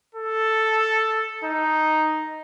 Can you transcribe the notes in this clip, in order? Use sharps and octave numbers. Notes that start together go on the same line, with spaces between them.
A4
D#4